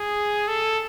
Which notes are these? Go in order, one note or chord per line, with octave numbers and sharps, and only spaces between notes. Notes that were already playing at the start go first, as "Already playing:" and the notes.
Already playing: G#4
A4